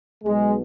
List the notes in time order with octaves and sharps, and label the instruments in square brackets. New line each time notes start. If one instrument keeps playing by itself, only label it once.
[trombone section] B1 B2 G#3